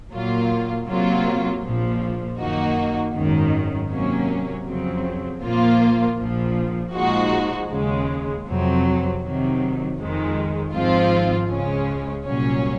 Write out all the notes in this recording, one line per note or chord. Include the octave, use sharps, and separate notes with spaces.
A#2 F#3 A#3 F4
C3 F#3 A#3 F4
A#1 A#2 F3
F#2 D#3 A#3 D#4 F#4
G#1 F#2 D#3
C3 F#3 A#3 C#4
F2 C#3 F#3 C4
A#2 F3 A#3 F4
A#1 A#2 F3
A#2 F3 G#3 D#4 F#4
D#2 C#3 G#3
F2 C3 F#3 C4
C3 D#3 F#3
F2 D#3 G#3
G#1 G#2 F3 C4 F4
C#2 C#3 G#3 C#4
C2 A#2 F#3 C#4